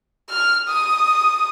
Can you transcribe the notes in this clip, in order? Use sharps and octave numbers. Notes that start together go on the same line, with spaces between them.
F6
D#6